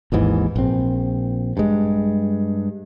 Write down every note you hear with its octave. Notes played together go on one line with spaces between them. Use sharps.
G#1 D#2 G#2 E3
A#1 C4
G2 G#3